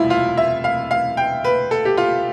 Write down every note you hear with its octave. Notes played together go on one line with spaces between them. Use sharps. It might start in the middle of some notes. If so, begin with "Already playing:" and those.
Already playing: E1 D2 C3 G3 E4 F4
F4
E5
F5
F5
G5
B4
A4
G4
F4